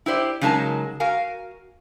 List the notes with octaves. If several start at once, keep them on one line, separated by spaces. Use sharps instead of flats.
E4 G4 C5 D5
C#3 F#3 G#3 D#4 A#4 A5
F#4 A#4 F5 G#5